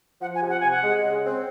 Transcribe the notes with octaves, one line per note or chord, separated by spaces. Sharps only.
F3 F#5
G#5
C3
F#5
C3 G#5
F#5
G#3
C#3
C4